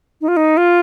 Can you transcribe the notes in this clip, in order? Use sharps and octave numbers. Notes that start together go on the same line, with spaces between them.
D#4
F4
D#4
F4